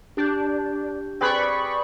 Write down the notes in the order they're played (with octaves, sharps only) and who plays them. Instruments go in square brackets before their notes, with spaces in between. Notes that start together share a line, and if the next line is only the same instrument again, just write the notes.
[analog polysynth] D4 [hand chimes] G4 G6
[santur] C4 G#4 B4 [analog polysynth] D5 B5 C#6